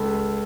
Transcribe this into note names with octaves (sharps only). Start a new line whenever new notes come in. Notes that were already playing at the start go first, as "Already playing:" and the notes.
Already playing: C#2 A4